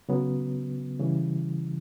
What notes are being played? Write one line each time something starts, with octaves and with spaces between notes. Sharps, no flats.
C#3 F#3 B3
C#3 E3 G3